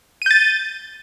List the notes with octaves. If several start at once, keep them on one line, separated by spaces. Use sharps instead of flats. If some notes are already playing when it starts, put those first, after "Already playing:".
G6 A6 D#7